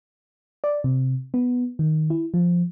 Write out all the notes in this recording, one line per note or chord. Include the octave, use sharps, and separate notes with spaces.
D5
C3
B3
D#3
E4
F3